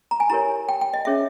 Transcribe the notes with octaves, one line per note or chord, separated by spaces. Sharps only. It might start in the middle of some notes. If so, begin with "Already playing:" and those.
A#5
G#5
E4 G4 A#4 C#5 A#5
G5
G5
D#5
C#4 G#4 C#5 E5